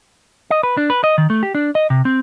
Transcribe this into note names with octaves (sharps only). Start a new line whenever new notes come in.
D#5
B4
D4
B4
D#5
D#3
A3
G4
D4
D#5
C3
C4